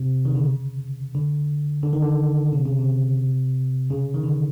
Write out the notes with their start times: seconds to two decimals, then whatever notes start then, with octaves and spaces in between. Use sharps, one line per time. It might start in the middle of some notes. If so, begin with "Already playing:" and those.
Already playing: C3
0.25 D#3
0.35 D3
0.45 C#3
1.15 D3
1.83 D3
1.93 D#3
2.02 D3
2.53 C3
2.66 C#3
2.79 C3
3.90 C#3
4.14 D#3
4.24 D3